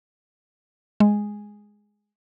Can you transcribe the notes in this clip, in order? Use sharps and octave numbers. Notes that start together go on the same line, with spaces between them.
G#3